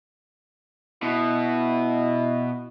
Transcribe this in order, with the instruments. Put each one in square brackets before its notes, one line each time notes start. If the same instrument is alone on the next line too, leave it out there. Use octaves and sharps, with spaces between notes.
[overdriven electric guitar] B2 [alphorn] E4